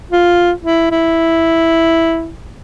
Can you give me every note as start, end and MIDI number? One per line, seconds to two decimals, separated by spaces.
0.11 0.52 65
0.64 0.88 64
0.91 2.31 64